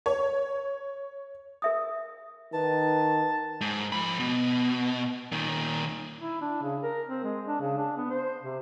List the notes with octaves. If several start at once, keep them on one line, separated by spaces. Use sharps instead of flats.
C#5
A#4 E5 D#6
D#3 B4 A5
G#2
F3 B5
B2
A#2 D#3
E4
D4
C#3
A#4
C4
G#3
D4
C#3
D4
B3
C5
C3